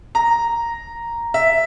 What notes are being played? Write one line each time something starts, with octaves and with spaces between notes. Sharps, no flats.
A#5
E5